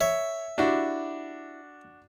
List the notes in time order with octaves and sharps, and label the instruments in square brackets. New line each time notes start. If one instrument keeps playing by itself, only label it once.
[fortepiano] C#5 [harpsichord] E5
[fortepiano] D4 F#4 [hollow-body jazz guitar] E4 G4